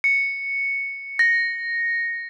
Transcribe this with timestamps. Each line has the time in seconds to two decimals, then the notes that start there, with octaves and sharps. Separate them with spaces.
0.04 C#7
1.19 A#6